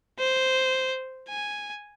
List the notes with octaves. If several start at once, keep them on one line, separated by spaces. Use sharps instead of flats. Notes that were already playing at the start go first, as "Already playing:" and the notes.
C5
G#5